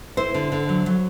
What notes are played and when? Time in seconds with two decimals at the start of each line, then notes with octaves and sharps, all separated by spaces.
0.17 E4 C5
0.34 D3
0.52 D3
0.69 F#3
0.86 F#3